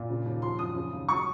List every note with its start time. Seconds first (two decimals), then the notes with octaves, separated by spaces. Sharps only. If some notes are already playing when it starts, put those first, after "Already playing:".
Already playing: A#2
0.09 C#3
0.25 D#2
0.42 F3 C6
0.59 F#2 D#6
0.75 C#3
0.93 D#2
1.09 F#3 C#6